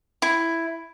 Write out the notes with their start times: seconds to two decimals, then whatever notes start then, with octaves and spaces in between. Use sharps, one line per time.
0.22 E4